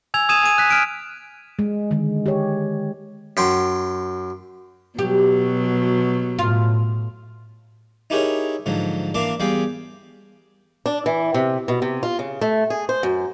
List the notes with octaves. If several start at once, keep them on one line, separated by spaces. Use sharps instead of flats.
G#5 E6 G#6 F7
D#6 G#6 D#7 E7
G#5 D#7
F#6 B6
F6 D7
G#3
D3 D#3 G#3
G4 C#5
F#2 G5 C6
B2 F#3 G4
A2 F4
D#4 E4 G4 G#4 A#4 C#5
G#2 D3 F3 F#3
E3 A#3 D4 A#4 F5 D6
E2 G3 G#4 F5 G5 D6
D4
E3
C3
B2
C3
F4
C#3
A3
G#4
C5
F#2